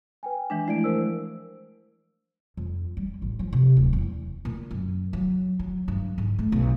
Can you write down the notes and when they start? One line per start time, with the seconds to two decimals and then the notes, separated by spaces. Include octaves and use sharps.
0.23 B4 G5 G#5
0.50 E3 G#3 D4
0.68 F3 A3 E4 D5 D7
0.84 A#4 C5 E6
2.57 F2
2.97 G3
3.22 A1
3.39 F3
3.53 C3
3.77 D1
3.93 E2
4.45 A#2
4.71 F#2
5.13 F#3
5.59 F#3
5.88 G2
6.18 G#2
6.39 A3
6.52 B1